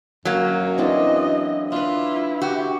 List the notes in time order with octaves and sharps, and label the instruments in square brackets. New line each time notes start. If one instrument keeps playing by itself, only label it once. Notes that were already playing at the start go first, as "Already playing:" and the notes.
[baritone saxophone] F#2 [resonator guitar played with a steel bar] F#3 A#3
[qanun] E3 C4 D4 [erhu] D#5
[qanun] D4 B4 [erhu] E4 [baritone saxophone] F4
[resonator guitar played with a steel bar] F#4 [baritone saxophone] G4